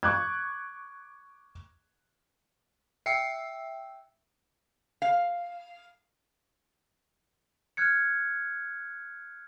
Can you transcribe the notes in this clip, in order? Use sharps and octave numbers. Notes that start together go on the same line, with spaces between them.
C#6 D6 F#6 G#6
E5 G5 E6 C7 C#7
F5
F6 F#6 G#6 C#7